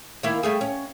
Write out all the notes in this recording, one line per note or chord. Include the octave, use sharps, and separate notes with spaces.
D#3 A#3 E4
G3 A3 G#4
C#4